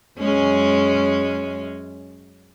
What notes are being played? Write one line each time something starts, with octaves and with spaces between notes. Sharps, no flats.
F#2 G#3 C#4